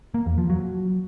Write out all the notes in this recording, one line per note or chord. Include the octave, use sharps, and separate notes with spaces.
A#3
E2
F3
F#3